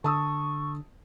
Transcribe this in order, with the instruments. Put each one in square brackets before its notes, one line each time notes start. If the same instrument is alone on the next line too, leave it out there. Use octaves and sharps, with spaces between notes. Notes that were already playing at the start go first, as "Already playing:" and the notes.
[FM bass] D3 [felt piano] A5 D#6 E6 [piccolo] C#6